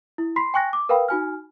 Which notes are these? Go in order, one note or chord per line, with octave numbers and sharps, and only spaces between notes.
E4
B5 C6 B6 C7
G5 G#5 C#6 F#6 A#6
D6
A#4 B4 F5 G5 B5
D#4 F#4 G#5 F6